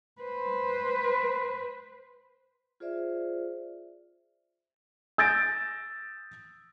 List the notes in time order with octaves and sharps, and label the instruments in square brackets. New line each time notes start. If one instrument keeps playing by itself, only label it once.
[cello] B4 C5
[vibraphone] F4 G#4 C5 D5 E5
[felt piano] E6 G6 A6 A#6 D7